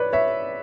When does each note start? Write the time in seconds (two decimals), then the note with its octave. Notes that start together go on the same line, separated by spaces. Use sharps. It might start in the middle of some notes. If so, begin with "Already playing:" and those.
Already playing: B4 C#5 D5
0.13 C#5 E5